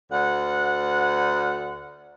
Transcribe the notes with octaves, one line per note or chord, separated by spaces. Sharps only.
D2 F#5